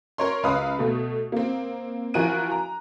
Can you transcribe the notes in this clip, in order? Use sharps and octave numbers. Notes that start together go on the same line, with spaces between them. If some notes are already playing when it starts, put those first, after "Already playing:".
A#4 C#5 C6
C#2 B4 F5 D#6
B2 A3
A#3 C4
E3 F3 F#4 A#4 F#6 D#7
A#5